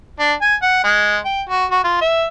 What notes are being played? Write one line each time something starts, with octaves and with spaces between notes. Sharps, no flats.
D4
G#5
F#5
G#3
G5
F#4
F#4
F4
E5